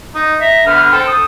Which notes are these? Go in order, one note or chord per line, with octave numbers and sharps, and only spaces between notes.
D#4
E5 A#5
D3 B3 F6
C4 A4 G5
D#6